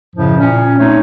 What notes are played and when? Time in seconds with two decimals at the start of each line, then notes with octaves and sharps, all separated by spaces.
0.16 F#2 A2 C#3 F3
0.39 A#2 C#4
0.79 A3 C4 D#4 C#5